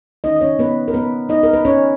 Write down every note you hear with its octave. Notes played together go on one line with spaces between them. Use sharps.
D#3 G#3 C#4 D#4 D#5
D#5
C#4 C#5
B3 B4
A#4
B3 B4
D#4 D#5
A#4
B4
C#4 C#5